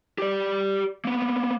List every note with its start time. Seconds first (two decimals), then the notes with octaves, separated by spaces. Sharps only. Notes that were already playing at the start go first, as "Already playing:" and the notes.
0.18 G4 D5
1.05 A#3 B3